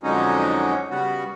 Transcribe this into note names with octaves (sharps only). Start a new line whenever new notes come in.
F2 D3 F#3 G#3 C#4 D#4
C#3 G3 B3 F#4